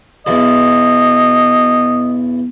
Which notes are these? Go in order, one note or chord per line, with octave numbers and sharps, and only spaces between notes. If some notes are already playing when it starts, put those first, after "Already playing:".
B1 E2 D#5